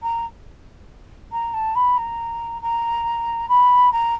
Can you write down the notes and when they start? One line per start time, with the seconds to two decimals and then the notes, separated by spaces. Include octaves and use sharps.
0.02 A#5
1.32 A#5
1.54 A5
1.75 B5
1.97 A#5
2.62 A#5
3.49 B5
3.92 A#5